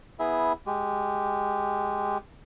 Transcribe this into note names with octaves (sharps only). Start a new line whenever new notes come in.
B3 E4 G#4 E5
G#3 G4